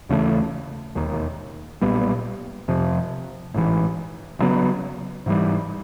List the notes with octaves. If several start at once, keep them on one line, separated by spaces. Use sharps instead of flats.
D#2 C#3 E3 A3
E1 D#2 D#3
B1 A#2 G3 B3
F2 C3 F3
A1 G#2 E3
D2 C#3 F#3 B3
G#2 E3 G3